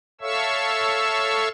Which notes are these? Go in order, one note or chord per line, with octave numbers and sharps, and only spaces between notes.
A4 C#5 E5 F5 C#6 E6